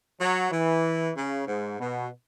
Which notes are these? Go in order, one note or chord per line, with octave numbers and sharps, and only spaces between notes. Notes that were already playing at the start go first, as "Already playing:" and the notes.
F#3
E3
C#3
G#2
B2